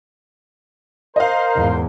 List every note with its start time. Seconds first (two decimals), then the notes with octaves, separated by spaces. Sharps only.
1.16 A#4 C5 D#5 F5
1.56 E2 G#2